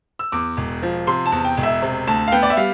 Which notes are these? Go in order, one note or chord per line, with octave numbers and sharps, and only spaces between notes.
E6
E2 D6
E1
F3
C3 C6
A5
E2
G5
E1
E5
C3
D2 A5
F5
B3 G5
D5
E5
G3 F5